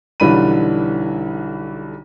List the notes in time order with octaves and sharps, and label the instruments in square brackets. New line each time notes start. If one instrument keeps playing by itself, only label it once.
[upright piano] B1 D3 E3 G3 B5 D#7